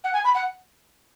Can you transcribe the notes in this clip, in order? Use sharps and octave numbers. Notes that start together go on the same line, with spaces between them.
F#5
G#5
B5
F#5